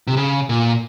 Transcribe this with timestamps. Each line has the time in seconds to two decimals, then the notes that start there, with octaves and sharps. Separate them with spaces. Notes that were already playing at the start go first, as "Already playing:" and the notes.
0.07 C3
0.17 C#3
0.49 A#2